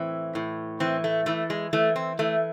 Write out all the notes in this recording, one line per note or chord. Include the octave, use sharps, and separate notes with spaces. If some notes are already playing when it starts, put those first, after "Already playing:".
Already playing: A2 E3 C4
A2
E3 C4
A3
E3 A3
G#3
E3 A3
C4
E3 A3